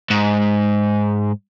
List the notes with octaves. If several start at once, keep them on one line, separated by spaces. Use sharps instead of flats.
G#2